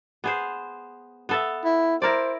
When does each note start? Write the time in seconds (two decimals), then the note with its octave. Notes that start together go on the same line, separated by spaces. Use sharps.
0.24 B3 G#4 C5
1.29 B3 A4 E5
1.64 E4
2.02 E4 A#4 C5 D5